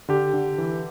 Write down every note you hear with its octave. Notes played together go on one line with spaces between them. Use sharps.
D3 G4
D3
E3